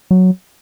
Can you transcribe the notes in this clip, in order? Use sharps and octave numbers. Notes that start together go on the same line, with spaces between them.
F#3